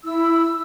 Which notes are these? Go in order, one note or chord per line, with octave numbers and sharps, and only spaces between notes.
E4 E6